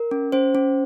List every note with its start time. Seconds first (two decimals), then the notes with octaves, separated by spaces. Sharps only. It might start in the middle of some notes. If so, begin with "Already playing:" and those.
Already playing: A#4
0.11 C#4
0.32 C#4 C5
0.55 C#4